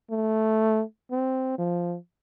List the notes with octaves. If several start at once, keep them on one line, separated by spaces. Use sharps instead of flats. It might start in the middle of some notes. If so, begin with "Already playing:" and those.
A3
C4
F3